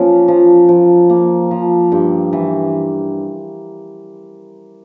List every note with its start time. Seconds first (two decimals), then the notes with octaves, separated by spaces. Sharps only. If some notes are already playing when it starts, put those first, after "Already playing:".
Already playing: F3 A#3 C#4
0.28 F3
0.69 F3
1.10 A#3
1.51 F3
1.92 G2
2.33 E3